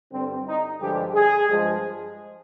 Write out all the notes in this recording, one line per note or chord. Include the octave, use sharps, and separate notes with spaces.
G2 D3 G3 C4
D#4
G2 D3 F3 G#3 G4
G#4
G2 F3 G#3